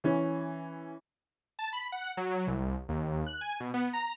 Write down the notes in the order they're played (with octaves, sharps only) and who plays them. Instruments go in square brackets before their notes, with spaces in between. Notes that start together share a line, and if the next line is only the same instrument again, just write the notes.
[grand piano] E3 C#4
[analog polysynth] A5
B5
F#5
F#3
C2
D#2
F#6
G#5
B2
B3
A#5